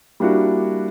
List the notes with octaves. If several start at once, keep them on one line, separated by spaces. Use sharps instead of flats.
G3 A#3 D4 E4 F#4